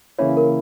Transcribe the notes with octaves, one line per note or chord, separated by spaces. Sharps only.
C#3 E3 A#3 C#4 E4 C#5
A#4